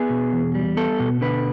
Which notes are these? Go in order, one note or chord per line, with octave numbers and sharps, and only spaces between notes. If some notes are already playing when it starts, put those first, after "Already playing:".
Already playing: B3 G#4
B2
E2
G3
B3 A4
B2
D3 B4